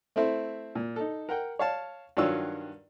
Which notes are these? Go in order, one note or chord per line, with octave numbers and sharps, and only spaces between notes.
A3 C4 E4
A#2
D#4 A4
A#4 F#5 G5
C#5 F5 A5
G2 D#3 F#3 F4 C#5 E6